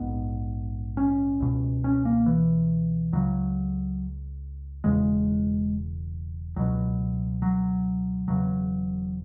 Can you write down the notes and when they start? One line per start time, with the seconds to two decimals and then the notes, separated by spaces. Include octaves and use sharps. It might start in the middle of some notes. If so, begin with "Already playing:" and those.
Already playing: A#1 G#2 B3
0.97 C#4
1.40 C#2 B2
1.84 C#4
2.05 A#3
2.26 E3
3.13 C#2 C#3 F#3
4.84 E1 E2 C#3 G#3
6.56 C#2 B2 F#3
7.42 F#3
8.28 E1 E2 C#3 F#3